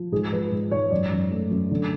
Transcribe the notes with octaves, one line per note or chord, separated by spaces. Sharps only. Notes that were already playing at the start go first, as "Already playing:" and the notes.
Already playing: F3
G#2 G#4
F3 B4
G#2
G#2 C#5
F#2 D5
F#2
A3
F#2
D3